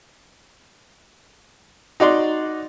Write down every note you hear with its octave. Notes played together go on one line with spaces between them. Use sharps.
D#4 F#4 D5 C6